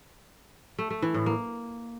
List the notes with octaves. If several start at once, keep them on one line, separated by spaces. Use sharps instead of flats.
A3
A3
E3
A2
A#3